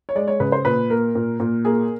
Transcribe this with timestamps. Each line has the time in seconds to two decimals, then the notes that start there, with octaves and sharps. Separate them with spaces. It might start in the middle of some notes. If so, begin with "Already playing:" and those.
0.09 C#5
0.15 G#3 D5
0.28 C#5
0.40 C#3 B4
0.52 C5
0.65 A#2 B4
0.90 A#3 A#4
1.15 A#2
1.40 A#2
1.65 A#3 G#4